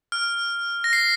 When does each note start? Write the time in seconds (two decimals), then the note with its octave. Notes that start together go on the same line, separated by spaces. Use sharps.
0.12 F6
0.84 A#6
0.93 C7